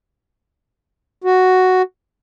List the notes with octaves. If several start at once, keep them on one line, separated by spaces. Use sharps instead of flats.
F#4